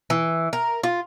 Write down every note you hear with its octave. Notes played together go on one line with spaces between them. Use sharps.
E3
A#4
F4